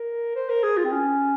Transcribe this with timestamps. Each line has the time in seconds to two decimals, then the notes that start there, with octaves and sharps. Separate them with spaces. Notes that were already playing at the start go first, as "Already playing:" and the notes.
Already playing: A#4
0.35 C5
0.49 A#4
0.63 G#4
0.77 F4
0.84 C4
0.92 C#4